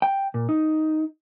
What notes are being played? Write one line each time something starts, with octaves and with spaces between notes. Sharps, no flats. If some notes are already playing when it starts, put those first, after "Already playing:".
G5
A#2
D#4